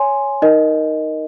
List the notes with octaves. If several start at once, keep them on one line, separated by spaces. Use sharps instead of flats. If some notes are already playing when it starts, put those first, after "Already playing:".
Already playing: C#5 G#5 C6
D#4 A#4 D#5